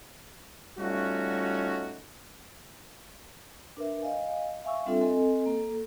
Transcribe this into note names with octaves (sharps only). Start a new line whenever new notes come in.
G3 A3 C#4 D#4 F4 F#4
D4 A#4 B4 E5
D#5 F5 G#5
E5 F5 G#5 C#6 E6
G3 C4 D4 F4 A4 E5
C4 A4 D#5 G#5
A#3 A4